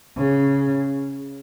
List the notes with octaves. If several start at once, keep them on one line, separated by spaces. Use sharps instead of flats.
C#3